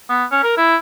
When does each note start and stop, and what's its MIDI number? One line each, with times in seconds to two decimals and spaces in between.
0.09 0.24 59
0.32 0.41 61
0.44 0.57 70
0.57 0.76 64